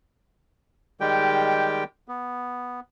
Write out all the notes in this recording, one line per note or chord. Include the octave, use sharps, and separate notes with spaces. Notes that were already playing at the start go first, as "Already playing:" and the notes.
D#3 G3 G#3 G4 G5
B3